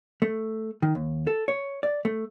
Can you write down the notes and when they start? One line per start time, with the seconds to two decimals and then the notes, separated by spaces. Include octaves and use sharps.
0.22 A3
0.82 D#3
0.95 D#2
1.27 A4
1.48 C#5
1.83 D5
2.05 A3